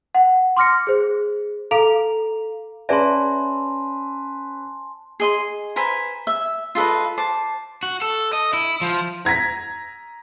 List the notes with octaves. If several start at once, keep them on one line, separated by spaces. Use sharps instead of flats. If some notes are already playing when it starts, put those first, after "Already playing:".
F#5
C6 D6 F6 A#6 C#7
G#4 C5
A4 F5 A#5 D6 D7 F7
C#4 G#4 B4 D5 E5 G#5 A5 C6
G#4 D#5 C6
B4 C5 G#5 A#5
E5
F4 A4 B4 D#5
C5 A5 D6
F#4
A4
D#5
E4
F3
A#5 G#6 A#6 B6